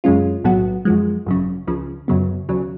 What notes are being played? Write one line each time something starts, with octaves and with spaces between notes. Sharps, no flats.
F#2 C#3 G#3 C#4 F4
B1 A2 F#3 B3 F#4
F#2 F3 G#3
G#1 F#2 C#3
C#2 C#3 F3
F#2 C#3 F#3 B3
D2 C#3 F#3